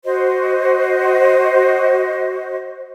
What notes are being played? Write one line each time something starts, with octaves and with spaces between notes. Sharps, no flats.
F#4 C5 D#5